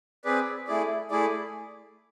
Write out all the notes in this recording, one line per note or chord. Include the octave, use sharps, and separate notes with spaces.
C4 G#4 B4 D5
A3 E4 G#4 D5
A3 E4 G#4 D5